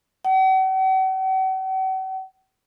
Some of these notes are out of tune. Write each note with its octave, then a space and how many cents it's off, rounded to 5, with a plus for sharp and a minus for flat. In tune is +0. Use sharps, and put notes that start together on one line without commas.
F#5 +45